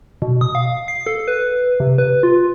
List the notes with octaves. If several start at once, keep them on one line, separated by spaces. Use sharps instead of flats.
B2
D#6
F5
C7
A4
B4
C3
B4
F4